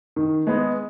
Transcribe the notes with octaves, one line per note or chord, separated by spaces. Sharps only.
D#3
G#3 B3